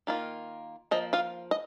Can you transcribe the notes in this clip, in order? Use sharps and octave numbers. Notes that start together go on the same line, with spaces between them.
D#3 A#3 F4
F3 A#3 D#5
F4 F5
D#5